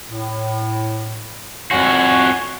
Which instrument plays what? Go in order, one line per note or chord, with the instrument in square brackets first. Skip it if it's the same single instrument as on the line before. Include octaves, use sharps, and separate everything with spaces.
[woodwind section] A2
[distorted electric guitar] F2 F#4 [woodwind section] C#5 G#5